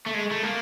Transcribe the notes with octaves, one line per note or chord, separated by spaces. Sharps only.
A3
G#3
A3
A#3